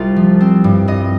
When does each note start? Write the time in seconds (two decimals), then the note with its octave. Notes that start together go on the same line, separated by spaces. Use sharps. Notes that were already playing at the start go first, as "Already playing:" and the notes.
Already playing: C2 F4
0.16 F3
0.40 C4
0.64 G2
0.88 G2 D#5